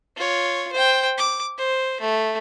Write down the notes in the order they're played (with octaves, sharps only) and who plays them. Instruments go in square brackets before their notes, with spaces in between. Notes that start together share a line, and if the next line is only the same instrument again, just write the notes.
[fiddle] F4 C#5
C5 G5
D6
C5
A3